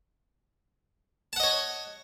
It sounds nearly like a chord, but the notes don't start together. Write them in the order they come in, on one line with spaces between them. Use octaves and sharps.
A5 F#5 D#5 C#5